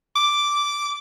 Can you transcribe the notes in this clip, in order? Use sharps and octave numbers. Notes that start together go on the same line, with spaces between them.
D6